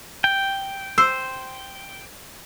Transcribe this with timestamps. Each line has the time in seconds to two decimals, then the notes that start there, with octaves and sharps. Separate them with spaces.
0.24 G5
0.98 C5 E6